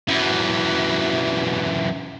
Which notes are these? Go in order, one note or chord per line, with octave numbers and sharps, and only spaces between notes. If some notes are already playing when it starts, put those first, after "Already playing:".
F#2 E3